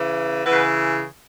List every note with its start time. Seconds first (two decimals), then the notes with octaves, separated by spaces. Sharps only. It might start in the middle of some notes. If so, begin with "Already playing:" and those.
Already playing: C#3 E3
0.45 C#3 E3 B3 B4